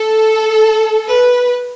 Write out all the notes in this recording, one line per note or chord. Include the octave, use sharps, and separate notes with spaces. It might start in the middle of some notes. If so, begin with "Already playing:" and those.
Already playing: A4
B4